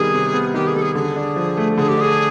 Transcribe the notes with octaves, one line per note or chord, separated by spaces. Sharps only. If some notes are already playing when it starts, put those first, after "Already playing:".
Already playing: C3 D#3 G3 B3 G#4
C3
B3
D#3 G4
G#4
G3 A4
G#4
D3 G#4
D4
F3
A3
D3 G#4
G4
D4 G#4